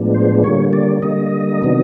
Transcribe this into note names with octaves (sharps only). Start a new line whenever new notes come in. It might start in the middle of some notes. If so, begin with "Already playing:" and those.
Already playing: A2 F3 G#3 B3 D4
C5
D3 G3 A#3 C#5
D5
D3 G3 A#3 D#5
C3 D#3 F#3 B3 D4